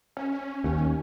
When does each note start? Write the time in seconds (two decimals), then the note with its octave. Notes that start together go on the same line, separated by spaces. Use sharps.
0.17 C#4
0.64 D#2